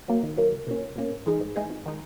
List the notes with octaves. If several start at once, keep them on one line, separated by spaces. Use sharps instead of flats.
F#3 A#3
D#3
F#3 A#3
C#2
B2 A#3 C#4
C#2
B2 A#3 C#4
G#2
E3 G#3 D#4 G#4
G#2
E3 G#3 D#4 G#4
G#1
D#3 G#3 D#4